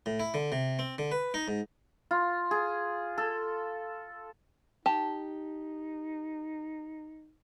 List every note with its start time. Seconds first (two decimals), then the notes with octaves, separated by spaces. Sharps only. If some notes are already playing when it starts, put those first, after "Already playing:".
0.06 A2
0.20 E4
0.34 D3
0.52 C3
0.79 C4
0.98 D3
1.12 B4
1.34 D#4
1.48 G#2
2.11 F4
2.51 G#4
3.18 A4
4.86 D#4 G4 A5